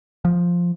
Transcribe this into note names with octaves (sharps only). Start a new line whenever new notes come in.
F3